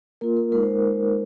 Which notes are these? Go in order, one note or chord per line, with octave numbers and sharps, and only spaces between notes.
A#3 F4 A#4
A#4
G#3 D#4 A#4
C5